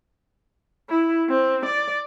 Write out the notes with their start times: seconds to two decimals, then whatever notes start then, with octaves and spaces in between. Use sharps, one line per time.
0.89 E4
1.29 C4
1.65 D5